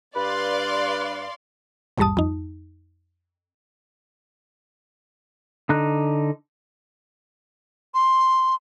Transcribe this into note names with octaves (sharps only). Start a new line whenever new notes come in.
G2 B4 D5 F5 C6
A#1 E2 G#2 G3 A5 D#6
F2 D#4
D3 D#4 F#6
C6